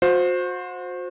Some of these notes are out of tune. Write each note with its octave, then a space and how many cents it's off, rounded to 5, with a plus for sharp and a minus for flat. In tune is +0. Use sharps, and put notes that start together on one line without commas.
F#4 -40 C5 +0